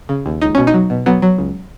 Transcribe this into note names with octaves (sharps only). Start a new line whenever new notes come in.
C#3
D#2
C#2 D#4
B2 C#4
D#4
F#3
B2
F#3 B3
F#3
C#2